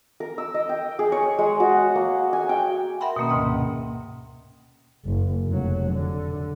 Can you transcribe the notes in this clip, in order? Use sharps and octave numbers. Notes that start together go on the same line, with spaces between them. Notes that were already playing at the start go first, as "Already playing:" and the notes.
A#4
E6
D#5
G5
G#4
C#5
G#3
F#4
F#5
A#3
G#5
G5
A#4 E5 F#5 G5 B5 C6
B2 D#3 A#3 C#4
D2 G#2 C3 D#5
F#1
F1 F#3
D3